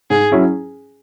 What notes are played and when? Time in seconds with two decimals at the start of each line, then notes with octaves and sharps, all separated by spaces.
0.10 G#2 G#4
0.32 F#3 C#4 E4